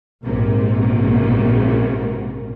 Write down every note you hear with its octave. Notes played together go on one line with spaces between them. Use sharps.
A#1 G#2 C3 A#3